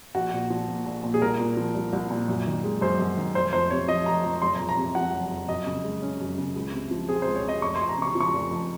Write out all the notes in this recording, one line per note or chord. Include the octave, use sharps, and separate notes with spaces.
A#1 F#4
A#2
F3
A#3
A#1
A#2
G#4
C2 A#4
A#2
F3
C2
C2
A#2
F#2
D#3
G#3
F#2 C5
F#2
D#3
F1 C5
F2 C5
C3 C#5
F3 D#5
F1 A#5
F2 A#5
F#1 C6
A#5
F2
A#5
C3
F3 F#5
F#1
F2
F#2 D#5
C#3
G#3
C#4
F#2
C#3
C#2
C3
F3
C4 G#4
C5
C#2
C#5
C3 D#5
F1 C#6
C6
F2
A#5
C#3 C#6
F3
C#6
F1
F2